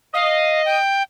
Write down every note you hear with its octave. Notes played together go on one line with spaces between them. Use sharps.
D#5 F5
G5